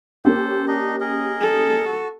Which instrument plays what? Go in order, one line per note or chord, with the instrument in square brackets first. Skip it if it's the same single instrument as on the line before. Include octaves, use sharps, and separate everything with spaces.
[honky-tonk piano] A#3 C#4 G4 [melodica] A4 C5
[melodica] D4 D#4 D#5
G#4 A#4 D#5
[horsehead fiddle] A4
[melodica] F#4